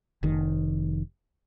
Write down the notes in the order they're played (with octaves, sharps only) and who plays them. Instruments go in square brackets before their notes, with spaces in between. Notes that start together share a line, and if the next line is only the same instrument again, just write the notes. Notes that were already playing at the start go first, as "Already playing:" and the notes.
[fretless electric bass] F1 D#3